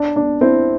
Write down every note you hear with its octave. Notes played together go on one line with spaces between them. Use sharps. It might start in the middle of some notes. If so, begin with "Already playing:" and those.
Already playing: D4
D4
C4 E4